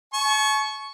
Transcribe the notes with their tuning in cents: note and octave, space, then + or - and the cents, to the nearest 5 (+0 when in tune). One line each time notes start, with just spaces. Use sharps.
A5 -45 C#6 +0